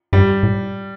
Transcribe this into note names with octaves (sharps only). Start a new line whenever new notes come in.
G2 G3
A2